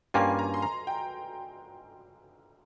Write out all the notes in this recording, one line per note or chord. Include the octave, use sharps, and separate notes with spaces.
G2 G3 A#3 C#4 F4 G#5
A#5
C6
A#5
G5